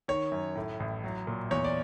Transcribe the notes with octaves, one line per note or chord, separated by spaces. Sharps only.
D#3 C#5
F#2
A2
A1
F#3
A#2
E2 C#5
D5